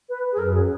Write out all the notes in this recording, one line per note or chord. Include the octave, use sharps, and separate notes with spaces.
B4
G#4
F#2 A#4
G#4